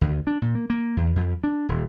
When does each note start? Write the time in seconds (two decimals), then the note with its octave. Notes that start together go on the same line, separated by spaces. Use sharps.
0.01 D2
0.27 D4
0.42 A#2
0.55 A#3
0.70 A#3
0.97 E2
1.16 F2
1.44 D4
1.69 D#1